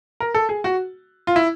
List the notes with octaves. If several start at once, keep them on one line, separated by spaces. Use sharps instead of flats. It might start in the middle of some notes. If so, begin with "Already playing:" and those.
A#4
A4
G#4
F#4
F4
E4